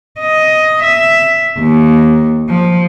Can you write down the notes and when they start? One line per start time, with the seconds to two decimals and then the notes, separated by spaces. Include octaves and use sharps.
0.20 D#5
0.82 E5
1.59 D#2
2.49 F3